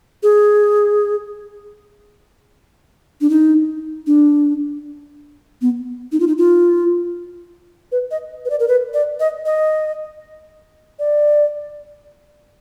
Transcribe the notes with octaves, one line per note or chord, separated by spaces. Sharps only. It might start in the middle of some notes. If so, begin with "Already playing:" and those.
G#4
D4
D#4
D4
B3
D#4
F4
D#4
F4
B4
D#5
B4
D5
A#4
B4
D5
D#5
D#5
D5